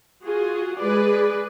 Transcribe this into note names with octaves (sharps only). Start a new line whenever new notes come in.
F4 F#4 G#4
G#3 G#4 B4 D5